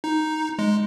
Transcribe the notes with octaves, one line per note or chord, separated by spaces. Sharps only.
D#4
G#3